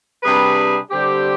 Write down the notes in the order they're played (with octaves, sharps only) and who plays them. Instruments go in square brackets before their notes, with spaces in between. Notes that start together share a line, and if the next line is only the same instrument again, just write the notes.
[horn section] C3 G3 D4 G#4 B4
D3 G3 C4 G4